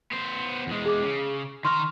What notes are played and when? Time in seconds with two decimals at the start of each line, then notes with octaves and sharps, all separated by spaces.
0.12 B3 C5
0.67 E2 G#3
0.86 G#4 D6
1.02 C#3
1.65 D#3 A#5 C6 C#6 F6